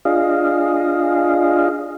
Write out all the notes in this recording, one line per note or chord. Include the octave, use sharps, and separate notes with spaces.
D4 F4 G#4 D#5 F5